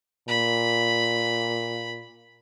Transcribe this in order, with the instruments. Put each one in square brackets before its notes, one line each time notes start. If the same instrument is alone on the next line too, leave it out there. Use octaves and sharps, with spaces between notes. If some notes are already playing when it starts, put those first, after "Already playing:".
[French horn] A#2 [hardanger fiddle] B5